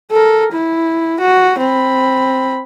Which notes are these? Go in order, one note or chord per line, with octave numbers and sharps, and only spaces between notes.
A4 A#4
E4
F#4
C4 B5